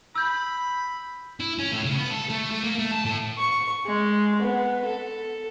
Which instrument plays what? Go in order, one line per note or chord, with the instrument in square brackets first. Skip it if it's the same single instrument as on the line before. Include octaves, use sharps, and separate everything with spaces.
[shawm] B5 [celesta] E6 G6
[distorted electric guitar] E4
C#4
A2
C#3
B3
A4
A3
A3
A#3
A3
A5
A2
[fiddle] C#6
G#3
B3
A4